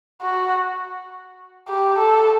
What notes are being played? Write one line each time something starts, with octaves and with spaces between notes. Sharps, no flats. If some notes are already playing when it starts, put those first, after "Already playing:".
F#4
G4
A4